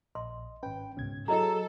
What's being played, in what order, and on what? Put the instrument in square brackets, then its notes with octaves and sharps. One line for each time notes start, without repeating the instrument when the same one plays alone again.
[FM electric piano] A#1 [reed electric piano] D#5 [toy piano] C6
[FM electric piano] G#1 B4 [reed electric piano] C#4 G5
[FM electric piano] C#2 B2 G#6 [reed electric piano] G#2 C#4
[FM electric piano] F#3 [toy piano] E4 D#5 A#5 [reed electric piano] F#4 G#4 C#5 [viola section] A4